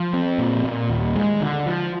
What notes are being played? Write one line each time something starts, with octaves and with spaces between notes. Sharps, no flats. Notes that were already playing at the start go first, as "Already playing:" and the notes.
Already playing: F3
C4
A#2
A#2
D#2
G#3
D3
F3